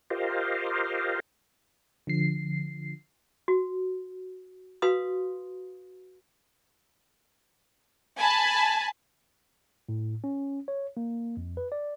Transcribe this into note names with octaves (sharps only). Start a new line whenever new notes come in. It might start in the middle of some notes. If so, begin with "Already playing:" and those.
F4 G4 A#4 C5 D#5 F5
D3 F3 C7
F#4
F#4 B4 F5 C6 D#6
G#5 A5 B5
A2
C#4
C#5
A#3
F2
B4
D5